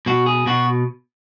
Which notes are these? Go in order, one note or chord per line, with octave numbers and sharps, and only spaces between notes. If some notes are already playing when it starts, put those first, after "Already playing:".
B2 F#4
G#4
B2 F#4